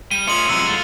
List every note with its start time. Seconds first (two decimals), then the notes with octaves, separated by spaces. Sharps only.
0.11 G3 D#7
0.27 A3 C#4 F4 D#5 C#7 F#7
0.49 C3 F3 F#3 G#3 E6
0.66 A3 F4